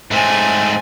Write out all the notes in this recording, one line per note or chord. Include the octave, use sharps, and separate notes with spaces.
G#2 A3 C4 G#5